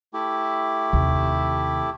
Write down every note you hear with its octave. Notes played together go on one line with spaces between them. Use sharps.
A3 E4 G4
D#2 C3